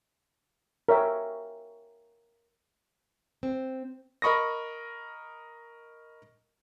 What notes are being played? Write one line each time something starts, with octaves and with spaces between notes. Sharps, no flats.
A#4 C#5 E5 G5
C4
A#4 D#5 B5 C#6 D#6 A#6